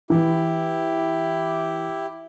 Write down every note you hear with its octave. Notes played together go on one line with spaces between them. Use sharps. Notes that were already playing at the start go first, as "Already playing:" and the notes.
E3 E4 G4